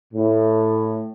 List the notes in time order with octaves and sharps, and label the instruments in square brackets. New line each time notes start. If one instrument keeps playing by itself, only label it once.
[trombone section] A2